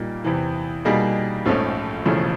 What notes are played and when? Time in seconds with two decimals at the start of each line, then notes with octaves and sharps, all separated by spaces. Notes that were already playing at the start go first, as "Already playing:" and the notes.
Already playing: A#2 G3 A#3 D#4
0.24 E2 C3 E3
0.85 B2 G3 A#3 D#4 G#4
1.46 A#1 G#2 F3 A3 C#4
2.05 E1 E2 C#3 F3 A3